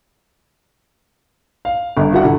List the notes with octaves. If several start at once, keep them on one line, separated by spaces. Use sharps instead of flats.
F5
G1
E4 F#4 F#5
D3